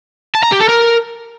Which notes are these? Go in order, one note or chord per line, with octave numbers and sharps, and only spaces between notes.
A5
A#5
G4
A4
A#4